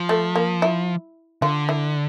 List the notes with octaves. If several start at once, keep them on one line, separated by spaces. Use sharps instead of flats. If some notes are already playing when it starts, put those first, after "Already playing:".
Already playing: F3
A3
A#3
E4
D3 F4
E4